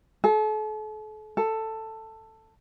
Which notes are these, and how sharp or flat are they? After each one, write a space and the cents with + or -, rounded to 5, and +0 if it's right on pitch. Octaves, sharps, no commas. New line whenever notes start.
A4 -40
A4 +10